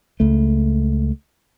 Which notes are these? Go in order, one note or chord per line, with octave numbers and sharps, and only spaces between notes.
C#2 A3